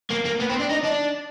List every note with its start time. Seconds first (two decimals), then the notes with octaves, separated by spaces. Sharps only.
0.10 A#3
0.25 A#3
0.40 B3
0.49 C4
0.59 D4
0.69 D#4
0.83 D4